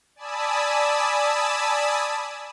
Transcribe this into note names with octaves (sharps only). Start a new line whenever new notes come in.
D5 G#5 A5 B5 D#6 E6